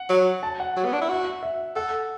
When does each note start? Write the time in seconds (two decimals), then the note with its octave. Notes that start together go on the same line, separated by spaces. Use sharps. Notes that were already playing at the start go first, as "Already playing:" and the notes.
Already playing: F#5
0.10 F#3
0.43 A5
0.60 F#5
0.77 F#3
0.85 B3
0.93 D4
1.02 E4
1.09 F#4
1.43 E5
1.76 A4 F#5